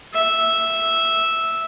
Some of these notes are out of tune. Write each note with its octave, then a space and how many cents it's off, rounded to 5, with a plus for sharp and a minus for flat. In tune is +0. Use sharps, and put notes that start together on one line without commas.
E5 -5